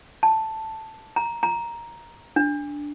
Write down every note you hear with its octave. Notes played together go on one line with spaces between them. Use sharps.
A5
A#5
A#5
D4